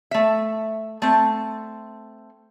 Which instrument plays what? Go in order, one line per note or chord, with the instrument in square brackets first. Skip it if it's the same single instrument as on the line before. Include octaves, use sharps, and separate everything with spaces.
[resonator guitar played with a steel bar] A3 E5
[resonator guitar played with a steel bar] A3 C4 [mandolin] A5